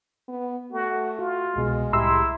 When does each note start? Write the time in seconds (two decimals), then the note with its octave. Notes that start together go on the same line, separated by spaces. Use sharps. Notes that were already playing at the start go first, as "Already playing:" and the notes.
0.28 B3
0.72 A3 F#4
1.19 F4 F#4
1.56 C2 B2 G#3
1.93 C2 A2 E4 G4 A#5 C6 E6